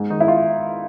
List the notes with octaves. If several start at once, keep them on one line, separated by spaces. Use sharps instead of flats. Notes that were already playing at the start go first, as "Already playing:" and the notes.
Already playing: G#2
D#3 D#4
E4
F4